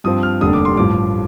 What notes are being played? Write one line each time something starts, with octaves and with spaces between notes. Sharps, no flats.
G2 F3 C4 D#6
F6
F1 D#2 D3 G3 D4 D#6
D6
C6
A1 G2 F3 D6